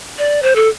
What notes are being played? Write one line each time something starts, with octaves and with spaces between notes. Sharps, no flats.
D5
C5
A4